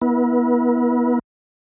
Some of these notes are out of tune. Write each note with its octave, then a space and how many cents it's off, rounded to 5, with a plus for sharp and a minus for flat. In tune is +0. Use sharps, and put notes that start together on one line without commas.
B3 -25 E4 -25 B4 -45